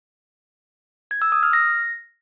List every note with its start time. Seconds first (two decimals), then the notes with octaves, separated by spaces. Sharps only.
1.11 G#6
1.22 E6
1.32 D#6
1.43 F6
1.53 A#6